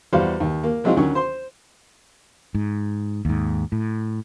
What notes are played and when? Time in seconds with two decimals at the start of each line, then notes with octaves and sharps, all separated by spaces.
0.13 E2 G3 F#4 C5 F5
0.40 D#2
0.64 A#3
0.84 F3 F#3 G#3 C4 D#4 F4
0.97 D2 D#3 F#3 C#4 C#6
1.15 C5 C6
2.55 G#2
3.25 D#2 G#2
3.72 A2